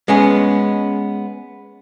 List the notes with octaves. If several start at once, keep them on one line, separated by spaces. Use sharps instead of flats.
G#3 B3 C#4